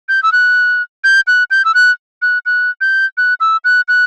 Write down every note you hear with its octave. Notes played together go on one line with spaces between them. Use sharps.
G6
E6
F#6
G6
F#6
G6
E6
F#6
F#6
F#6
G6
F#6
E6
F#6
F#6